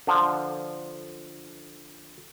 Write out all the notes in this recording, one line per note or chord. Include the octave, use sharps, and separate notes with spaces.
D3 F3